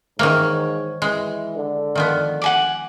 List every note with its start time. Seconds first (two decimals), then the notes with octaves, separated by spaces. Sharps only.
0.19 G#2 D#3 E3 A#3 C#5
1.02 E3 G#3
1.56 D3
1.95 D#3 F3 B3
2.42 F#5 G#5 D6